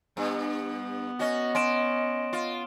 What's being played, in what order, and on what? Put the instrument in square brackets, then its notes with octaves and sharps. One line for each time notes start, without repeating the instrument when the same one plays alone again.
[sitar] G2 [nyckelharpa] B3
[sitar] C#4 F#4 [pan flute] D#5
[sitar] C#4 [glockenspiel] C6 D7 E7
[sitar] F4